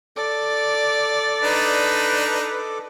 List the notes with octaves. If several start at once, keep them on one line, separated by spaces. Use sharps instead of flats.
A4 D5 D6
D4 D#4 B4